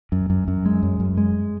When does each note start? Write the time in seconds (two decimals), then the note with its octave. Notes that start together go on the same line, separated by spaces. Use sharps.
0.12 F#2
0.30 F#2
0.48 F#2
0.66 G#3
0.83 F#2
1.00 F#2
1.17 G#3